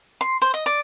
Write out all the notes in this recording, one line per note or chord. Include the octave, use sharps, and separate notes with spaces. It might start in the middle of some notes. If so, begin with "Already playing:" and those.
C6
C5
D#5
D5